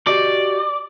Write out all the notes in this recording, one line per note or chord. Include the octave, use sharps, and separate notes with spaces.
F#4 G4 D5 D#5